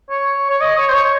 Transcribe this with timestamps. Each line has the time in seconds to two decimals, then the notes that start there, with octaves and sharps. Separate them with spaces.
0.10 C#5
0.50 C#5
0.61 D#5
0.78 C#5
0.89 C5
0.94 C#5